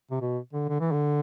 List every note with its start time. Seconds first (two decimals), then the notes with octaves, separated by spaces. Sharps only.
0.11 C3
0.21 B2
0.53 D3
0.69 D3
0.80 E3
0.92 D3